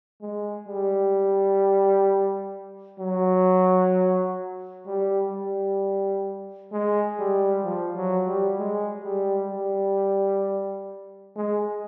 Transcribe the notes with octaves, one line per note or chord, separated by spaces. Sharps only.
G#3
G3
F#3
G3
G3
G#3
G3
F3
F#3
G3
G#3
G3
G3
G#3